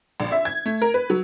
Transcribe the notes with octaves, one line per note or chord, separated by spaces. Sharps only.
A#1
E5
G#6
A3
A#4
B4
F#3